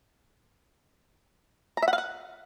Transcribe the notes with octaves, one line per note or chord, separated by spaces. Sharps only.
A#5
E5
F#5
F5
F#5